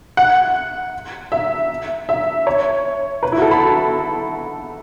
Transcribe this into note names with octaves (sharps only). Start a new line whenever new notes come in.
F#5
E5
E5
C#5
B4
E4
F#4
A4
B5
A5